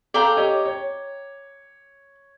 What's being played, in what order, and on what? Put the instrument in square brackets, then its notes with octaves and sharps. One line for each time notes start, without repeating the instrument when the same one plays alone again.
[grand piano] A4 F5 [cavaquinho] D5 G5 A#5
[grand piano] G4 C#5 D#5
C#5